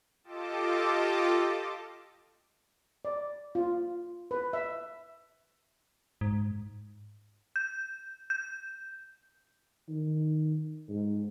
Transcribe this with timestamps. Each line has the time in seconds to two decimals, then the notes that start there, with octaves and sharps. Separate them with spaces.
0.24 F4 G4 A4 D#5 A5 D6
3.05 D5
3.55 F4
4.31 B4
4.53 E5
6.21 G#2
7.56 G6
8.30 G6
9.88 D#3
10.89 G#2